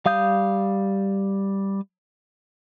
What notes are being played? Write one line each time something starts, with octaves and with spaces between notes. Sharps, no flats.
G3 F5 D#6 G6